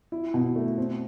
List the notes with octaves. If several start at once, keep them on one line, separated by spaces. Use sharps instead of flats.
E4
B2
A3
C4